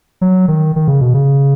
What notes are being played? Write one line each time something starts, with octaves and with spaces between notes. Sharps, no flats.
F#3
D#3
D#3
C#3
B2
C#3